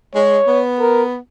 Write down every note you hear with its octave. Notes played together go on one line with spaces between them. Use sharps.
G#3 C#5
B3
A#4